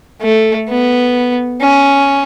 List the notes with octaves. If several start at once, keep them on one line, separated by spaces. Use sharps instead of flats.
A3
B3
C#4